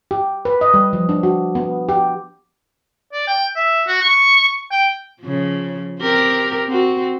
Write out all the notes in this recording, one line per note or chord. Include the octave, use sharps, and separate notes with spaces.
G4
B4
D#5
G3
F3
D4
F#4
B3
G4
D5
G5
E5
F#4
C#6
G5
C#3 F3
C4 G4 A#4
C4 F#4